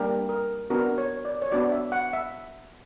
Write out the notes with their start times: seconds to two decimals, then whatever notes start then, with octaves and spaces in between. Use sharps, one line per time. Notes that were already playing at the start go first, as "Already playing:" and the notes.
Already playing: G3 A#3 D4 G4 A#4
0.29 A#4
0.70 B3 D4 F#4 A#4
0.98 C#5
1.25 D5
1.42 C#5
1.52 B3 D4 F#4 D5
1.72 E5
1.92 F#5
2.13 E5